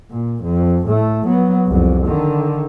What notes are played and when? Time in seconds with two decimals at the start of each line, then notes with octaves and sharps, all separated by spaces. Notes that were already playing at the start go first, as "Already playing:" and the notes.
0.10 A#2
0.44 F2
0.88 A2 A3
1.27 F#3 B3
1.68 C2 F2
2.07 D3 D#3